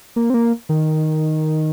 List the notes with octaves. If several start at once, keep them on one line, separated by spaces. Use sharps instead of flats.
A#3
C4
A#3
D#3